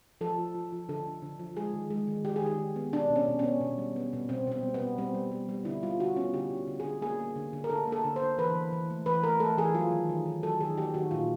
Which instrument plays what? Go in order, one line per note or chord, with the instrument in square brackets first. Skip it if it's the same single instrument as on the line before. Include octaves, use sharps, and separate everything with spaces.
[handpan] F3 A4
F3
F3
F3
D3 A4
D3
D3
F3
G#3 G#4
D#3
G#3
D#3
D#3 G4
G#4
D#3 G4
D#3
B3
B2 D4
B2
C#4
B2
B3 C#4
B2
G3
B3
B2
B2 C4
B2 C4
G3
B3
B2
G3 C4
G3
G3
G3
D3 E4
G3 F4
D3 F#4
B3 C#4
D3 G4
D3
D3
D3 G#4
A#3 G#4
A#3
D3
D3
A#4
D3 A4
A#3 A4
D3
C5
D3
E3 B4
E3
E3
A3
E3 B4
A3 A#4
A3 A4
E3 G#4
F#3 F4
D#3
D#3
D#3
F#3 A4
D#3 G#4
A#3 G4
D#3 F#4
A#2 F4